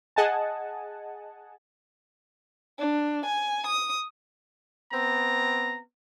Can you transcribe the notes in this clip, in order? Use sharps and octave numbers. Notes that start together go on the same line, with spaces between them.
G#4 D#5 F#5 G#5 A5
D4
G#5
D#6
B3 C4 A#5